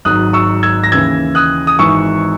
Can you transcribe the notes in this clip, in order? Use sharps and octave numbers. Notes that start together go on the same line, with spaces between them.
G#1 G#2 F#3 D#6 F#6
C#6 E6
E6 G#6
A#6
D#2 C#3 E3 E6 G#6
D#6 F#6
D#6
G#1 G#2 E3 C#6 E6